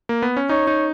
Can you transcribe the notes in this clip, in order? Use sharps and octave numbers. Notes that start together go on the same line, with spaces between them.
A#3
B3
C#4
D#4 C#5
D#4